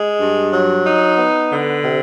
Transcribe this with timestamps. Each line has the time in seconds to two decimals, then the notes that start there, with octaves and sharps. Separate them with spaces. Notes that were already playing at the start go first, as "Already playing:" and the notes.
Already playing: G#3
0.20 G2
0.53 F#3
0.86 D#4
1.18 B3
1.52 D3
1.84 C3